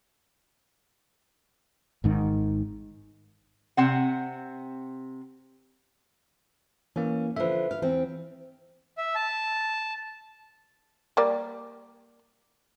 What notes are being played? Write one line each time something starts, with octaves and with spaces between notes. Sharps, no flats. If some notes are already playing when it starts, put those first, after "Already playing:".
G#1 G#2 D#3
C3 C4 F#5
E3 A#3 C#4
D3 F3 B4 E5
F5
E2 E3 C4
E5
A5
G3 A#3 D5